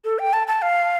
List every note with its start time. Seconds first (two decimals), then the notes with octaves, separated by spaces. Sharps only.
0.04 A4
0.19 G5
0.33 A5
0.47 A5
0.62 F5